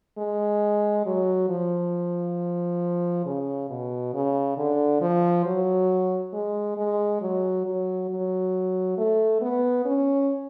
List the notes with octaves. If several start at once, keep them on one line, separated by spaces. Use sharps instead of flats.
G#3
F#3
F3
C#3
B2
C#3
D3
F3
F#3
G#3
G#3
F#3
F#3
F#3
A3
B3
C#4